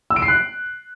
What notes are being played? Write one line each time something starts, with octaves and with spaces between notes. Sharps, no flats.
E6
D7
C7
F#6